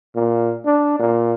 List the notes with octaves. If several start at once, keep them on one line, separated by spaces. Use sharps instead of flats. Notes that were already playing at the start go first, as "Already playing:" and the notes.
A#2
D4
A#2